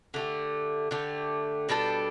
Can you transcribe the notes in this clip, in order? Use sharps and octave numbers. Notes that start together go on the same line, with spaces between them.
D3 A3 G4
D3 A3 G4
B2 G3 D4 A4